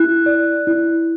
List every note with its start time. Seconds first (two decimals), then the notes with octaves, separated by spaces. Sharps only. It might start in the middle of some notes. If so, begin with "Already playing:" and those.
Already playing: E4 F#6
0.26 D5
0.67 E4